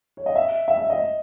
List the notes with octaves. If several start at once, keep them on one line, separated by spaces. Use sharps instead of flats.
C#5
D#5
E5
E5
E5
D#5